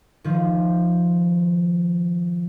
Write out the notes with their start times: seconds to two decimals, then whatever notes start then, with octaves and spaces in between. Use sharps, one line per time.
0.24 D#3 F3